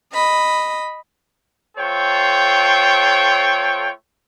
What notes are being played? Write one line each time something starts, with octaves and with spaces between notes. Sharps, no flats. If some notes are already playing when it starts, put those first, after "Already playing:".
D#5 B5
A3 F4 A4 C5 C#5 G5